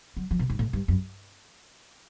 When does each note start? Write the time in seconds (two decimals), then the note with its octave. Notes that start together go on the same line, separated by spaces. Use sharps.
0.17 F#3
0.31 F3
0.39 B2
0.50 G#2
0.59 A2
0.73 G2
0.88 F#2